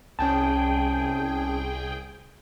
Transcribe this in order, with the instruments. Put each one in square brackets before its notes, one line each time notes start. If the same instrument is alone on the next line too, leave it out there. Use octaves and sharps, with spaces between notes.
[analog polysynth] C2 G#4 G5 [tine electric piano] C#4 A5